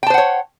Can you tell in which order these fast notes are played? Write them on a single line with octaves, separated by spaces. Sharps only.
G5 A5 C5 F#5 C#5